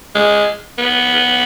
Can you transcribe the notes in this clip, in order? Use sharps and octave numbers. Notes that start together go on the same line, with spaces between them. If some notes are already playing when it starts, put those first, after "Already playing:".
G#3
B3